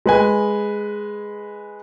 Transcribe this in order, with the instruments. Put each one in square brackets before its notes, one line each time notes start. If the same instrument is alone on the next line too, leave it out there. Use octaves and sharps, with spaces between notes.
[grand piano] G#3 B4 G#5